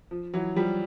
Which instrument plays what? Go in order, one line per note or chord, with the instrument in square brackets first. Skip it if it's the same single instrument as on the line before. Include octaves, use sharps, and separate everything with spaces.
[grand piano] F3
E3 F#3
F3 G3